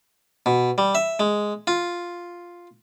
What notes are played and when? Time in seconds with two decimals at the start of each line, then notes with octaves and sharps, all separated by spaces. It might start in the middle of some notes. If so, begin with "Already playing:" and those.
0.46 B2
0.78 G3
0.95 E5
1.20 G#3
1.67 F4